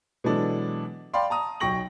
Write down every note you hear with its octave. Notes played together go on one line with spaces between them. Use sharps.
B2 E3 F#3 G#3 D4 A4
D5 F5 G5 B5 C6
A5 A#5 D#6
B1 F#3 G5 C#6 A#6 F#7